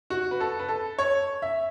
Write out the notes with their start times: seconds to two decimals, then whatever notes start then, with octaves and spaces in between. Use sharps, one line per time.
0.10 F#4
0.31 B4
0.40 A4
0.59 B4
0.68 A4
0.98 C#5
1.42 E5